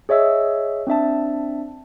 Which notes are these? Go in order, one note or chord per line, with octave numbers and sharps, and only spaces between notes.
G#4 C#5 D#5 E5 E6
C4 D4 E5 A5